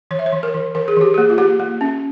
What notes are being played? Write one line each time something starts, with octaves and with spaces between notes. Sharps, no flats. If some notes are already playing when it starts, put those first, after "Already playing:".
E3 C#5
E5
C#5
E3
A#4
E3
E3 A#4
G#4
E3 G4
A#3 G#4
F4
A#3 G4
A#3
C#4